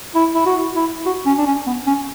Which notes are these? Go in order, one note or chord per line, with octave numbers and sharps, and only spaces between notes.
E4
E4
F#4
E4
F#4
C#4
D4
C#4
B3
C#4